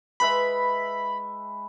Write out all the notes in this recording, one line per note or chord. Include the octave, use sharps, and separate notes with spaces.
G#3 B4 E5 B5